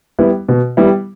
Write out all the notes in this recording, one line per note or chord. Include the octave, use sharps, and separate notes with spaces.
G3 B3 E4
B2
G3 B3 E4